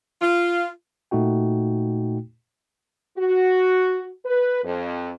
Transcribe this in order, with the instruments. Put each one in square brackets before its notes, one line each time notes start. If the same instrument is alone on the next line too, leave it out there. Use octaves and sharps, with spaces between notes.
[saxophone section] F4
[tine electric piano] A#2 A3 D#4 F#4 G5
[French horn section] F#4
B4
F2